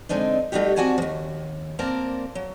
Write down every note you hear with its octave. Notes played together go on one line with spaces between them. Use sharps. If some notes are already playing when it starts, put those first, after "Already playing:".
D3 G#3 C4 D4 D#4
G3 A3 D#4 F#4 G4
C4 F#4 D5 F#5 G#5 A5
D#2 F3
A#3 C4 A#4 D5 A5 A#5
F#3